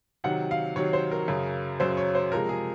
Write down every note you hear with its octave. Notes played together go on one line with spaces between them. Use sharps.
C3 D#3 F#3 F#5
F5
C3 D#3 F#3 C#5
C5
A#4
F#2 C#3 F#3
F#2 C#3 F#3 C5
C#5
C5
C3 F3 G#3 A#4
G#4